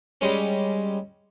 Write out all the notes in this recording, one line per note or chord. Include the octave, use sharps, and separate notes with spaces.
G3 G#3 C#4